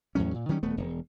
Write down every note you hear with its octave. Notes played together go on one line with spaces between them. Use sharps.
E2 A2 F#3 C#4
A#2
D#3 F#3 G3 C#4
D#1 A3 B3
E1